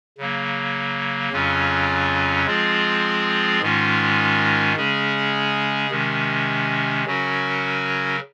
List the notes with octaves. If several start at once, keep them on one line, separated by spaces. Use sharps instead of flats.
C#3 F#3 A#3
F2 C#3 F#3 C#4 F4
F3 G#3 C4 F4 G#4
G#2 D#3 G#3 C#4 F4
C#3 G#3 C#4 G#4
C3 D#3 G#3 C#4
C#3 F#3 C#4 F#4 A#4